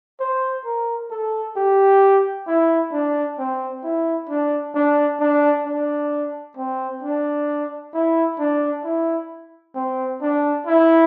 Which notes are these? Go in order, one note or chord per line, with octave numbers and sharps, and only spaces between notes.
C5
A#4
A4
G4
E4
D4
C4
E4
D4
D4
D4
D4
C4
D4
E4
D4
E4
C4
D4
E4